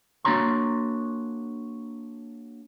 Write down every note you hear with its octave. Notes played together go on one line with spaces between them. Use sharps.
A#3 D4 F#4 C#5 A#5 C6